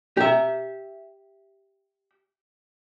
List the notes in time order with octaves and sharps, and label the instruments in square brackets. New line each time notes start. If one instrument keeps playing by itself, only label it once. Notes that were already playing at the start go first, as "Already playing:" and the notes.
[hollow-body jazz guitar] G4 E5